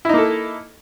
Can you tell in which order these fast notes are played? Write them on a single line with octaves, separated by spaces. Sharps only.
E4 D#4 A#3 A4